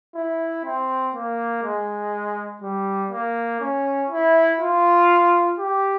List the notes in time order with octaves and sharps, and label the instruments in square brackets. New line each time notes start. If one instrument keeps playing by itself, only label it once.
[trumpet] E4
C4
A#3
G#3
G3
A#3
C#4
E4
F4
G4